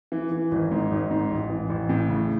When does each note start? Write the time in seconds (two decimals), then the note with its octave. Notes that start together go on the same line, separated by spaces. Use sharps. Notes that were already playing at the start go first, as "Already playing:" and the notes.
0.12 E3
0.32 E3
0.51 G#1
0.71 G#2
0.91 G#1
1.11 G#2
1.31 A1
1.50 E3
1.70 A1
1.89 A2
2.09 C#3